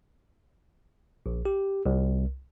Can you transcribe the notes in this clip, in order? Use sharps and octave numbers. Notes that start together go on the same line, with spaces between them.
A#1
G4
C2